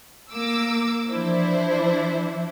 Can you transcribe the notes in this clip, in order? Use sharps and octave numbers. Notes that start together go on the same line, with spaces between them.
A#3 D6 E6
E3 F3 D4 E4 C5